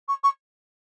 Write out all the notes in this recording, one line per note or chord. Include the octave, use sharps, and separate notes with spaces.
C#6
C#6